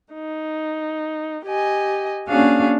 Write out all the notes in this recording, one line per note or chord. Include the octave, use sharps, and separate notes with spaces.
D#4
G4 D#5 G#5
A#3 C#4 D4 F#4 G#4 F5